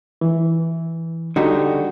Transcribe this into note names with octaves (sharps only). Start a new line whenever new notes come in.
E3
D3 G3 D#4 F#4 G4